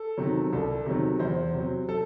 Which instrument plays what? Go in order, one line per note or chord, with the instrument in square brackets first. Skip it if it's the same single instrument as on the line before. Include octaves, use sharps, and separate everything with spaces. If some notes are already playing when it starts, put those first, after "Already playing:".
Already playing: [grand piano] A4
C3 D#3 F#3
C2 A4
C3 D#3 F#3
E2 C5
C3 F#3
A4